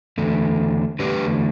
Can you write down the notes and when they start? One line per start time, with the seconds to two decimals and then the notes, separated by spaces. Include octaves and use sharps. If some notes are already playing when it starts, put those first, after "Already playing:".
0.18 E2 D3 A3
0.99 E2 D3 A3 G4 B4